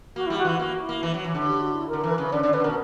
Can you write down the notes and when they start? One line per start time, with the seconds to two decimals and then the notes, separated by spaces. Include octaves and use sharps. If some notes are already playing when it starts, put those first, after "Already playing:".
0.16 A#3 F#4
0.27 G3 E4
0.38 F#4
0.45 E3 E4
0.59 A#3 F#4
0.81 E4
0.89 A#3
1.03 E3
1.14 F#3
1.24 E3
1.34 D3
1.46 G4
1.60 F#4
1.74 E4
1.89 A#4
1.93 D3
2.01 E3 A#4
2.10 B4
2.18 C#3
2.32 D3 D5
2.43 D3 D5
2.53 D3 B4
2.64 B2 A#4